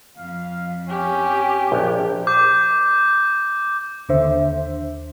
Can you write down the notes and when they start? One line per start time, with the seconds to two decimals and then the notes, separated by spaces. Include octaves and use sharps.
0.18 F2 F5
0.89 C#4 G4
1.72 A#1
2.27 D6 G6
4.09 D#2 D3 C5 E5